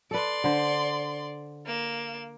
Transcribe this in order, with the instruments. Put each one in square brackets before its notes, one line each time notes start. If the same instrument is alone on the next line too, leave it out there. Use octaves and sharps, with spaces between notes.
[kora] A4 B4 [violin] D5 C6
[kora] D3 C5
[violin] A#3 E7